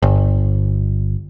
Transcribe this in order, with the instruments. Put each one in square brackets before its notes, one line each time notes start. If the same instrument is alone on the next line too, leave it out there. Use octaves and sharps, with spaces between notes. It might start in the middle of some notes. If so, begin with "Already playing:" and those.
[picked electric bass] G1